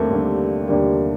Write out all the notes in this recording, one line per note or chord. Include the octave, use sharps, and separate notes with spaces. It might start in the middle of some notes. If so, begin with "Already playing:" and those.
Already playing: D#2 D3 G3 A3 A#3 C4
D#2 D3 G3
D#2 D3 G3 A#3